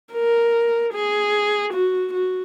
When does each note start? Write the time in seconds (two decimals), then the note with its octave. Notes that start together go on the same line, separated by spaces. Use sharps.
0.13 A#4
0.93 G#4
1.73 F#4
2.14 F#4